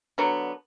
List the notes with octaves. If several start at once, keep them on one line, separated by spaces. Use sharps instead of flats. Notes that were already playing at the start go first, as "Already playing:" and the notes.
D3 F#3 B3